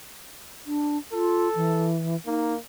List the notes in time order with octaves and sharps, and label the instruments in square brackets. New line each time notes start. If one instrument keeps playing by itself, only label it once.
[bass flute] D4
[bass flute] F4 [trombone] A4
[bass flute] E3
[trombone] A#3 [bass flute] D#4